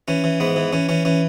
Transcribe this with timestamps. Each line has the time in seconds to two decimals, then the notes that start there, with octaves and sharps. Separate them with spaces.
0.08 E3 C#4
0.24 E3
0.40 G#2 B3
0.56 E3
0.73 E3 C#4
0.89 E3 C#4
1.05 E3 C#4